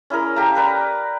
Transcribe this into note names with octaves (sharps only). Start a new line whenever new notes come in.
C#4 E4 G#4 A#4
G4 A4 F5 A#5
A#4 B4 D5 A#5